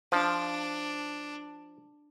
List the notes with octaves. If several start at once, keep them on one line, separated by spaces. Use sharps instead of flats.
F3 D4